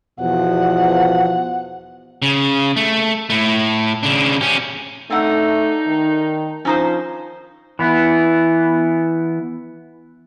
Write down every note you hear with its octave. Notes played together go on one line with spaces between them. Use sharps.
E2 B2 F3 F#5
C#3
A3
A2 A3
C#3 D4
C#4 G4
A3 C4 D4 D#4 F#5
D#3
F3 C#4 D#4 C5
E3 B3 E4